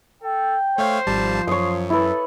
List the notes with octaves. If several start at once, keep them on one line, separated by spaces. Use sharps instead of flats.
A4 G5
A3 C5 C#5 F5
G#1 F3 G3 A5
F#2 C#5 C6 D#6
E4 A4 B4